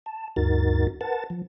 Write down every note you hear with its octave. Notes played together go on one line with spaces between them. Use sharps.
A5
D2 G2 D#4 F#4 A#4 A6
A#4 B4 F#5 A5 A6
F3